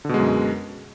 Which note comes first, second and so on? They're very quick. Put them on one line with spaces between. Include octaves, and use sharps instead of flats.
D3 B2 G#3 F#2